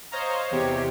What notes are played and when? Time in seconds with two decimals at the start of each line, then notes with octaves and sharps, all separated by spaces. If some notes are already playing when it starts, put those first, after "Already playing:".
0.12 C5 C#5 D#5 F5 A#5
0.51 E2 C3 G4 C#5